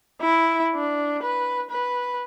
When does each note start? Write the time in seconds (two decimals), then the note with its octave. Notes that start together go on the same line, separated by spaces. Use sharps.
0.22 E4
0.75 D4
1.23 B4
1.71 B4